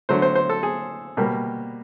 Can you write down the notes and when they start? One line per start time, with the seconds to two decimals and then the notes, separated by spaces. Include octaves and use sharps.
0.09 D3 F#3 A3 C5
0.22 C5
0.35 C5
0.50 A4
0.63 G#4
1.17 B2 G3 A#3